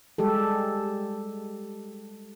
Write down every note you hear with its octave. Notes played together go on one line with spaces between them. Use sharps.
G3 G#3 G4 A4